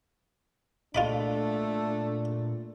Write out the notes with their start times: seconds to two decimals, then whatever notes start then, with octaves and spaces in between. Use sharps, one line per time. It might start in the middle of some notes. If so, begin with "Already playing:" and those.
0.95 A#2 A3 D4 F4 D#5 B5